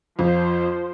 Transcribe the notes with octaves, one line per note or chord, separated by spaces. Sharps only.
F2 F3 C5